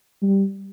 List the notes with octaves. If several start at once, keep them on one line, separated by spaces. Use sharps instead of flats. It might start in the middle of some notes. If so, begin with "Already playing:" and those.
G3